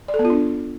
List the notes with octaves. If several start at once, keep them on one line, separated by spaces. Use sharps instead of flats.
D5
A4
B3
F4
D4